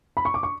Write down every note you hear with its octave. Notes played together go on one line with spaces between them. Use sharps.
B5
C#6
D6
C#6